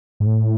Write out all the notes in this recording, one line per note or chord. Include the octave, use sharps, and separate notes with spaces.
G#2
A2